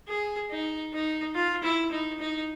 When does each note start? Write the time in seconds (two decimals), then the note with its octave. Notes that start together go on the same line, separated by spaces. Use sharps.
0.08 G#4
0.51 D#4
0.93 D#4
1.35 F4
1.63 E4
1.92 D#4
2.20 D#4